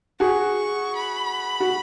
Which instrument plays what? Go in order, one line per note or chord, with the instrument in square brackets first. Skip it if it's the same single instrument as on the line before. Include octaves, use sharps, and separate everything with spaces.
[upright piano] F#4 G#4 [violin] C#6
[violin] B5
[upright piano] F#4